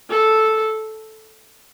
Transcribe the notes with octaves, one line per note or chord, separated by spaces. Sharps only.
A4